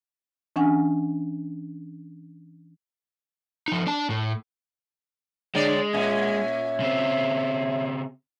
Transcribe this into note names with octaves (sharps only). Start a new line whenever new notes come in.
E3 C#4 D4 F#5 G#5
F3 D#4
D4 A5
A2
D3 G#3 C#5 D5
A#2 C#4 E5
C#3 C4